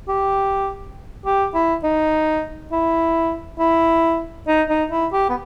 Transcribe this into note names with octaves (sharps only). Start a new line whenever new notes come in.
G4
G4
E4
D#4
E4
E4
D#4
D#4
E4
G4
B3